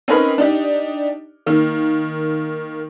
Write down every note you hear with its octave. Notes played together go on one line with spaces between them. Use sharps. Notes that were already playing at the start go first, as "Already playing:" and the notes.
C4 C#4 D#4 A#4 B4 D#5
D4 D#4 G4
D#3 A#3